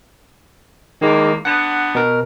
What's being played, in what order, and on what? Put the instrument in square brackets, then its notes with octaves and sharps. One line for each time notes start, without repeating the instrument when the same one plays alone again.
[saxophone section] E2 A#3 [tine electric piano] D#3 G#3
[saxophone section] D3 B3 [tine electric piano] F#5
[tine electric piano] B2 A#4